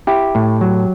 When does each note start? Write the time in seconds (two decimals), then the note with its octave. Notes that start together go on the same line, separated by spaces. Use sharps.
0.07 E4 G4
0.35 A2
0.61 F#3